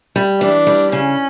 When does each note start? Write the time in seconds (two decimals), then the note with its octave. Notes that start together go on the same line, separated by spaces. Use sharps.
0.16 G3
0.41 E3 D4
0.67 G3
0.92 C#3 C#4